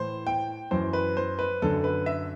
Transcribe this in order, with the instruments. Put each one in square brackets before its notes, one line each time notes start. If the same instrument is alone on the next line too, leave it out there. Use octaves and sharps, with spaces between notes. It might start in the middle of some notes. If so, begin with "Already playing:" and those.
Already playing: [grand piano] A2 E3 C5
G5
F#2 E3 C5
B4
C5
B4
F#2 D3 A4
B4
E5